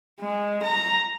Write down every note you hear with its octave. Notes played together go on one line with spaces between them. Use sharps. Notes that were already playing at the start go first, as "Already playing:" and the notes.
G#3
A#5